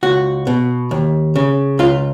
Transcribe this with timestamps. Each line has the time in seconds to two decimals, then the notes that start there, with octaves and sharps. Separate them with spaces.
0.03 C#2 F#4
0.47 B2
0.91 D#2
1.36 C#3
1.79 C#2 F4